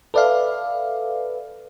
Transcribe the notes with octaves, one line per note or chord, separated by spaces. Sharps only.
A4 B4 D5 E5 F5